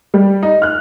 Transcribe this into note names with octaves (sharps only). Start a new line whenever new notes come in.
G3
D#4
F6 F#6